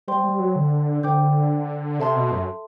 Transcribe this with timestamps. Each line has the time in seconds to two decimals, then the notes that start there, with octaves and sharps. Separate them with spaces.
0.08 G3 C5 G5 C6
0.24 G3
0.39 F#3
0.56 D3
1.03 D3 C5 G5 D6 G6
1.99 C3 A4 E5 A5 C6
2.16 B2
2.32 F#2